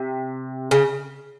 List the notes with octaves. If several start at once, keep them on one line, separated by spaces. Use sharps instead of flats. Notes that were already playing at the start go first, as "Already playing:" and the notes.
Already playing: C3
C#3